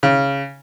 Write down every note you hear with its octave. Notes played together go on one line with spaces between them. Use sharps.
C#3